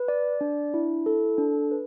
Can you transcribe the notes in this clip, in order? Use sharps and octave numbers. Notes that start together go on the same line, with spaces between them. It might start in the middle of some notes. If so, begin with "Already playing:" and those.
Already playing: B4
D5
D4
E4
A4
D4
B4